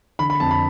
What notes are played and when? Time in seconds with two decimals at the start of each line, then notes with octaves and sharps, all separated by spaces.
0.19 D3 B5
0.30 B5
0.40 F2 A5
0.51 B5